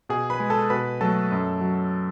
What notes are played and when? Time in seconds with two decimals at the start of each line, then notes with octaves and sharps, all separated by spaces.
0.09 B2 G#4 G#5
0.30 B4 B5
0.40 G#3
0.50 A4 A5
0.70 B2 B4 B5
1.01 F#3 A3 A4 A5
1.31 F#2
1.61 F#3